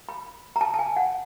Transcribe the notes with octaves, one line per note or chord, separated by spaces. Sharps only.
B5
A#5
A5
A5
G#5
F#5